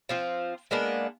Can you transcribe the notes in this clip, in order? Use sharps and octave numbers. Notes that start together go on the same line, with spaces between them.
F3 C4 F4
G#3 A#3 B3 D4